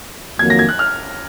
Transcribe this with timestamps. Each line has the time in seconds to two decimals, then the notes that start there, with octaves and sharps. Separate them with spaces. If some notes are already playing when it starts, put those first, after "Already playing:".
0.39 F2 D#3 F#3 A#3 G#6
0.50 A#6
0.59 G#6
0.69 F#6
0.79 F6